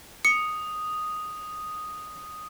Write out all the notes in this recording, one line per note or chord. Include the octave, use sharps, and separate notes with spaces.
D#6 C#7